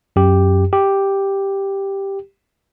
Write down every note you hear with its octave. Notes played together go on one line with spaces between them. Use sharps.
F#2 G4
G4